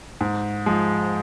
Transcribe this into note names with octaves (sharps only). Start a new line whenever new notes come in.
G#2
F3 G#3